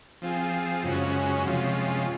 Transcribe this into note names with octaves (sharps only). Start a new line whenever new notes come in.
F3 C4 F4 G#4
F#2 C#3 G#3 C#4 F#4
C3 F3 G#3 C#4 F4